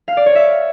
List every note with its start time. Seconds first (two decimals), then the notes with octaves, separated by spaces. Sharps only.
0.08 F5
0.17 D5
0.26 C#5
0.35 E5